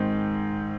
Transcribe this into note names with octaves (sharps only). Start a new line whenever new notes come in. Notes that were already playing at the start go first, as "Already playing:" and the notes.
Already playing: G#2 D#3 G#3 C4